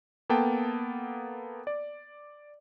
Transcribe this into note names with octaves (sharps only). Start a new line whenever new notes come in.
A#3 B3 A4 G5 A5
D5